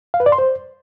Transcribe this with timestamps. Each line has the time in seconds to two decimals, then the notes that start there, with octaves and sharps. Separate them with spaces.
0.14 F5
0.20 B4
0.26 D5
0.32 C6
0.38 C5